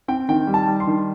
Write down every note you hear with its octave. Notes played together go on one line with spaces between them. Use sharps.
C4 G5
D#3 G5
G3
A5
G3
C6
D#3